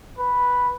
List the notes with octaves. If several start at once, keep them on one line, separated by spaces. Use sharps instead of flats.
B4